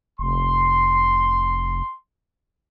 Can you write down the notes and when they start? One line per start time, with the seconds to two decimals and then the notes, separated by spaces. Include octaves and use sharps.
0.19 F1 C6